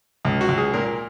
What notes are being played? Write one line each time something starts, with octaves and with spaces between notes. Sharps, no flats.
C#2
F#4
C#2
G#4
A#2 A#4